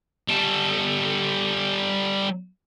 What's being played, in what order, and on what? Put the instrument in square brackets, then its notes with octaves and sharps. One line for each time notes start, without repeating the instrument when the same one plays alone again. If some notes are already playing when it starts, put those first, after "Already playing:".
[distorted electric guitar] G3 A4